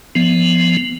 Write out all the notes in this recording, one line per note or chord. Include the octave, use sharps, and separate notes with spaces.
F3 B3